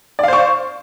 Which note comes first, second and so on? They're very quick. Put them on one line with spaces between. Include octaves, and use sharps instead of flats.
D5 F5 C5 C#6